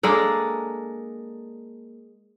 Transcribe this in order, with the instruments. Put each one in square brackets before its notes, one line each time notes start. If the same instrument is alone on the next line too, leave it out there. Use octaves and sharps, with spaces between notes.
[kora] G#3 A#3 D4 A4